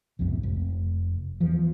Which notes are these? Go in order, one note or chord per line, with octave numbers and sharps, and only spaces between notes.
B1 F2 G#2 C3
F1
E2 F3